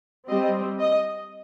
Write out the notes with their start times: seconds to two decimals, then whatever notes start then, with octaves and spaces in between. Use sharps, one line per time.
0.29 G3 C4 D#5
0.79 D#5